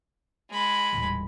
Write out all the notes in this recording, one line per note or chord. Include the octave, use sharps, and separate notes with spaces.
G#3 B5
D#1 A1